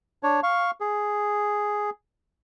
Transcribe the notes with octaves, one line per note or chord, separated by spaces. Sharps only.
D4 C#5
F5 C#6
G#4